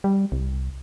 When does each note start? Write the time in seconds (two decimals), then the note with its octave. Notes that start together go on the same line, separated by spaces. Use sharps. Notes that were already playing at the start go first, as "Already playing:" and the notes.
0.04 G3
0.32 C2